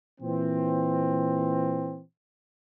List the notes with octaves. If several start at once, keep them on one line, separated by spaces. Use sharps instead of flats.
A#2 E3 C4